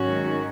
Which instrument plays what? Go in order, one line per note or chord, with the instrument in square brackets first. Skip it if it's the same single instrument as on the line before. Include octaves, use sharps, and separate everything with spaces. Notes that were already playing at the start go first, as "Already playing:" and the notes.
Already playing: [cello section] G#2 D#3 F#3 C#4 F#4